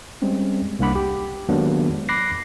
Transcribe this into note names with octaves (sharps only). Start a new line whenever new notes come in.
G3 G#3 C4 C#4
C2 A#3 D4 F#5 B5 D6
G4
D#3 F#3 G#3 A#3 B3 D4
B5 D6 F#6 A#6 C7